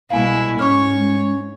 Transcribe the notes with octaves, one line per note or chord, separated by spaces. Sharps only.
C2 B2 G#3 E4 F5 G#5
G#2 C#4 C#5 C#6 D6 F6